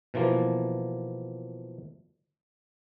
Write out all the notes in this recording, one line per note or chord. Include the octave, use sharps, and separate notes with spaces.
B2 E3 F3 A#3